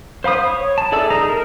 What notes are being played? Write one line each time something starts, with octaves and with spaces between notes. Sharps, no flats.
C5 F5 B5 D#6
C#5
A5
G#4 A4 D5 E5 E6
D#4 G#4 A4 A#5
A#4